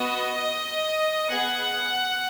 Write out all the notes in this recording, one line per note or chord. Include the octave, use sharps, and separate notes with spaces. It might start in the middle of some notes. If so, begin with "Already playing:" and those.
Already playing: B3 F#4 D#5
B3 G#4 F#5